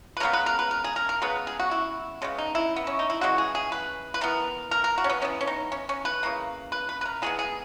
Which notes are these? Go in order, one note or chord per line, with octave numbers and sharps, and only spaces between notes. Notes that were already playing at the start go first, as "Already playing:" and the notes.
B4
C#3 G#3 B3 A#4
B4
A#4
B4
A#4
G#4
A#4
A#4
C#3 G#3 B3 B4
G#4
F#4
E4
C#3 G#3 B3
D#4
E4
B3
C#4
D#4
E4
C#3 E3 G#3 F#4
G#4
G#4
B4
B4
E3 B3 A#4
A#4
A#4
F#4
C#4
B3
E3 B3 C#4
C#4
D#4
C#4
C#4
B4
C#3 E3 A#3
B4
B4
B4
A#4
E3 G#3 B3 G#4
G#4